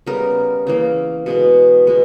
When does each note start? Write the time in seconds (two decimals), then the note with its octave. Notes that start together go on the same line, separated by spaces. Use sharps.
0.06 C#3 G3 B3 A#4
0.67 C#3 E3 A#3
1.26 B2 G#3 B3
1.87 B2 G#3 B3